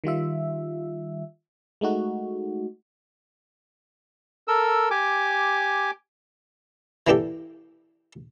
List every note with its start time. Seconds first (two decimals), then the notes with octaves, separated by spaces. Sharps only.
0.04 D#3 G3 F4 E5
1.81 G#3 A3 D#4 F#4
4.48 A4 A#4 E6
4.91 G4 G#5 D6
7.07 E3 A#3 D4 G4 A4